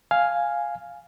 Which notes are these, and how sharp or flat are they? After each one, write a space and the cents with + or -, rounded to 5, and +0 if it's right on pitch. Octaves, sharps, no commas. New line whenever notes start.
F5 +0 G#5 +0